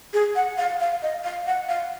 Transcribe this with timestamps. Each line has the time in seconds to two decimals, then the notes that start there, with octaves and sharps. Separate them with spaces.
0.13 G#4
0.35 F#5
0.58 F5
0.80 F5
1.02 D#5
1.24 F5
1.46 F#5
1.69 F5